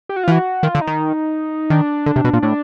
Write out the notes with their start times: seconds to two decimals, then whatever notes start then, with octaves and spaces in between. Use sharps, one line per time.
0.09 G4
0.16 F#4
0.24 F4
0.28 E3 F#4
0.63 D#3 F4
0.75 D3
0.81 D#4
0.87 D#3
1.70 D#3 D4
2.06 D3
2.16 C3
2.24 B2
2.33 A#2
2.42 A2 D4